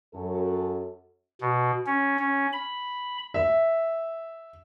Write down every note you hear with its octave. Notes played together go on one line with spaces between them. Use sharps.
F#2 A4
B2
C#4
C#4
B5
E5